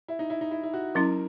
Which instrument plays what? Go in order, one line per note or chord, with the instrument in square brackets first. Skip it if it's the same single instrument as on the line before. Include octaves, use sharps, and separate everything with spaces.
[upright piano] E4
D#4
E4
D#4
E4
E4
F#4
[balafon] F#3 C#4 E4 [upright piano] A#4